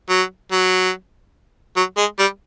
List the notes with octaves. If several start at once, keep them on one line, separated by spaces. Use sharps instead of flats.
F#3
F#3
F#3
G#3
G3